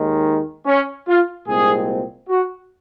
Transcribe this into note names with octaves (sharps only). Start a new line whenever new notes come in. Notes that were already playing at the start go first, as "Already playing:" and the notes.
Already playing: D#2 D#3 G#3
C#4
F4
C2 A#2 G#3 C4 G#4
F#4